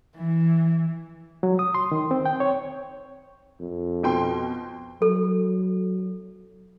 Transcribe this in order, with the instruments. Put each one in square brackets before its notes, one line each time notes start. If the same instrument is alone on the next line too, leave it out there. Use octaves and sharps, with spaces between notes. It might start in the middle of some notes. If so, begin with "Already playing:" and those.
[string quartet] E3
[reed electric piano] F#3
D#6
C6
D#3
C4
G5
C#5
[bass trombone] F2
[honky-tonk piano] B2 G5 C6
[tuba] F#3 [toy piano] A4